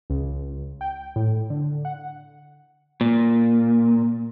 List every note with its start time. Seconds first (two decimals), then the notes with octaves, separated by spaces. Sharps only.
0.10 C#2
0.81 G5
1.16 A2
1.50 D3
1.85 F#5
3.01 A#2